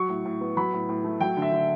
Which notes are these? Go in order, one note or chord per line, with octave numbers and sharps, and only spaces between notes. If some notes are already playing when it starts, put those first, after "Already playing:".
Already playing: F#3 C#6
A2
A2
B3
F#3 B5
A2
A2
A3
F#3 G5
D3
E5
D3